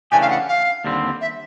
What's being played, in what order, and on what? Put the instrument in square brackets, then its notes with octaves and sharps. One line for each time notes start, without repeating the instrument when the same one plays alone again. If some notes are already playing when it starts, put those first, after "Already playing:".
[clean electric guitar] C#3 E3 A3 D4 G4 [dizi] G#5
[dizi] F5
F#5
F5
[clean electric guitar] D#2 D3 G3 C4
[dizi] E5